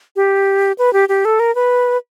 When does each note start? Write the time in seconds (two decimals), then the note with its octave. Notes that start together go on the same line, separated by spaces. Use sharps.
0.16 G4
0.78 B4
0.93 G4
1.09 G4
1.25 A4
1.40 A#4
1.55 B4